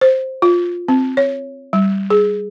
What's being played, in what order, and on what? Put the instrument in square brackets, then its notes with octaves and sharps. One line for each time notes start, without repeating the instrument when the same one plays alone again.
[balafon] C5
F4
C4
C#5
G3
G#4